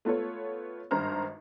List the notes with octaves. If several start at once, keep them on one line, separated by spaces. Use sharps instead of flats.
A3 B3 F4 A4 C#5
G#1 G2 C5 A#5 F6